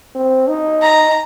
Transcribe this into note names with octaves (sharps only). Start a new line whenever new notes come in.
C4
D#4
A#5